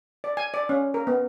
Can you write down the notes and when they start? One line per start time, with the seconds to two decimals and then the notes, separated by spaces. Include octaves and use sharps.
0.24 D5
0.37 G#5
0.54 D5
0.69 C#4
0.94 A#4
1.07 B3